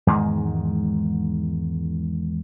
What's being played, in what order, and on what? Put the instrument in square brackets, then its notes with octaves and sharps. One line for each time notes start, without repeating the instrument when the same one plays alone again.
[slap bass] E2 G#2 D#3 G#3